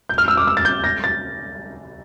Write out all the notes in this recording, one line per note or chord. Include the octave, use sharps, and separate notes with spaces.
G6
F6
E6
D6
E6
A6
G6
A#6
A6